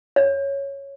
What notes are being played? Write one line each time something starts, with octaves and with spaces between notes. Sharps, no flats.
C#5